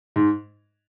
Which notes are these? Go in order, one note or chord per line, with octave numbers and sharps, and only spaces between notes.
G#2